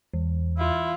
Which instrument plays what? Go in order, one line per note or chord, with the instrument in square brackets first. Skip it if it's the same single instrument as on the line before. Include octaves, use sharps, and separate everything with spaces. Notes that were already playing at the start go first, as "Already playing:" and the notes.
[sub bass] E2 [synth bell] E3
[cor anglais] E4 [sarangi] F4